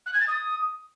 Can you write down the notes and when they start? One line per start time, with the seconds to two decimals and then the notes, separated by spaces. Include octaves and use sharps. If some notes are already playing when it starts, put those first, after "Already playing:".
0.06 F#6
0.13 G#6
0.21 A6
0.28 D#6